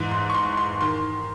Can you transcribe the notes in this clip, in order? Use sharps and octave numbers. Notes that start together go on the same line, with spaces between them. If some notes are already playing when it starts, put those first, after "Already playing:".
Already playing: G#2 E3
C6
C#6
C6
C6
D#3 C6